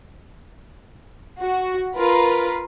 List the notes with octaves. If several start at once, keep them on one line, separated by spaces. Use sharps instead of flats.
F#4
F4 A#4 B4